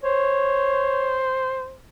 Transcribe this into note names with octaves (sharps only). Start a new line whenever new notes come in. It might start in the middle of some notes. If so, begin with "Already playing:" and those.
C5 C#5